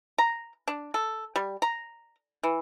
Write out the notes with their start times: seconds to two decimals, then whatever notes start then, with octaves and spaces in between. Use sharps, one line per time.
0.18 A#5
0.68 D4
0.94 A4
1.36 G3
1.62 A#5
2.43 E3